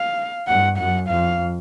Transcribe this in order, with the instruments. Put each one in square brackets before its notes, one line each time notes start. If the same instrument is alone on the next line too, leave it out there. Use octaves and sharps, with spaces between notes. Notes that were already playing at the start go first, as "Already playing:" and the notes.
Already playing: [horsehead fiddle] F5
[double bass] G2 [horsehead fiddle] F#5
[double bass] F#2 [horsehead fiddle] F#5
[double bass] F2 [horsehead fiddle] F5